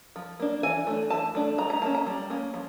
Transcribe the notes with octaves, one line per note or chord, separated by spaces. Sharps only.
F3
A#3 D4
E3 G#5
A3 D4
E3 A5
A3 D4
G3 A#5
A#5
A#3 C#4 A5
A#5
G3
A#3 C#4
F3